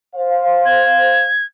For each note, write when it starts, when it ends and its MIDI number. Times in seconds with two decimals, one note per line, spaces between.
0.15 1.30 72
0.15 1.30 77
0.65 1.45 92